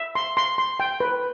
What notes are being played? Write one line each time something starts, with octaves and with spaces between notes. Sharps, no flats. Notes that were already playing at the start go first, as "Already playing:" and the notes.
Already playing: E5
C6
C6
C6
G5
B4